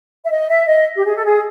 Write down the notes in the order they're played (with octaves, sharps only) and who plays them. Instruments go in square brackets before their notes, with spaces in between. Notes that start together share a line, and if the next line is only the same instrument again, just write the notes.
[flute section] E5
D#5
E5
D#5
G4
G#4
A4
G#4